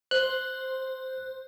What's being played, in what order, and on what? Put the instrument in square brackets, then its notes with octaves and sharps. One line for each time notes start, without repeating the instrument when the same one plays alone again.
[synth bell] C5 [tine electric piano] F#6